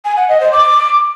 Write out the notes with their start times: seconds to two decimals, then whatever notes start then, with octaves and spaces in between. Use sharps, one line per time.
0.05 G#5
0.17 F#5
0.28 D#5
0.40 C5
0.52 D6